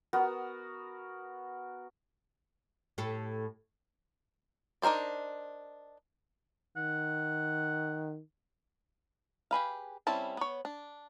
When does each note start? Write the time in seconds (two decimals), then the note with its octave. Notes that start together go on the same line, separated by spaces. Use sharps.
0.13 B3 F#4 A#4
2.98 A2 G4 A4
4.82 D4 D#4 A#4 C5 D5
6.77 D#3 F#5
9.51 G4 G#4 B4 F5
10.07 G3 C4 C#4 E4 A5
10.37 B3 C#5
10.65 D4